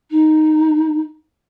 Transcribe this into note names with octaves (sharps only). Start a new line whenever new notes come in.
D#4